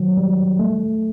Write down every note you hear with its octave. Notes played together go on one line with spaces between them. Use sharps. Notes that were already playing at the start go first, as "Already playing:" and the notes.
Already playing: D#3 F#3
G3
A3